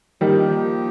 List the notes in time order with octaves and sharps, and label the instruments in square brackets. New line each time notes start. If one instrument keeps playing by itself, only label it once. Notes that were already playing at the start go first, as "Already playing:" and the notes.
[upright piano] D#3 G3 [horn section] F3 A#3 D#4 G4